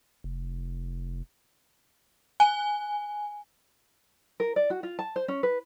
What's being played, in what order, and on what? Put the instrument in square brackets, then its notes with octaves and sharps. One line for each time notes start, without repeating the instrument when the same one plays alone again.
[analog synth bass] F1
[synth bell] G#5
[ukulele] A#4
D5
F#4
F4
A5
C5
C#4
B4